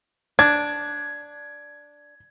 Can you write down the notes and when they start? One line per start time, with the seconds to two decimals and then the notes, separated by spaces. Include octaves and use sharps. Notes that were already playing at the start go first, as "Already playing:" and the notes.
0.39 D4 G#6